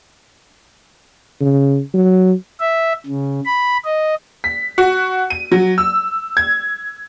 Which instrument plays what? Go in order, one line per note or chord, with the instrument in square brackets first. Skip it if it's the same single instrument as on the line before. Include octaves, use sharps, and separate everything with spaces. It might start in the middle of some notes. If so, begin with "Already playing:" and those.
[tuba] C#3
F#3
[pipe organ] E5
C#3
B5
D#5
[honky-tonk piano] B6
F#4
D#7
F#3
E6
G#6